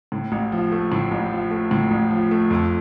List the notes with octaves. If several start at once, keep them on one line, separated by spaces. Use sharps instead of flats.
A2
A1
F3
A3
A2
A1
F3
A3
A2
A1
F3
A3
F2